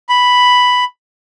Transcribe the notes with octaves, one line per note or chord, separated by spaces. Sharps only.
B5